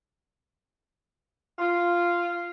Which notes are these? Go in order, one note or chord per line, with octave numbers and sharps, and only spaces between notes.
F4